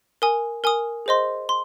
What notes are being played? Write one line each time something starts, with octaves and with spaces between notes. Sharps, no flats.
A#4 G#5 D#6
A#4 G#5 D#6
G#4 C5 D#5 C6
C6